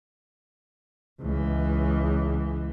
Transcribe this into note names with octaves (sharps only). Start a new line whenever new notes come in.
C#2 E3